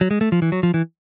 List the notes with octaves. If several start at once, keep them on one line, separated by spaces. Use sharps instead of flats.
F#3
G#3
A3
F3
E3
F#3
F3
E3